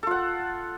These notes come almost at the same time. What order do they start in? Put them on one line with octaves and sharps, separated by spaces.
A4 F4 F#5